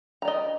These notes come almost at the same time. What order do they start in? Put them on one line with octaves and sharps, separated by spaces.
A#5 D5 D#5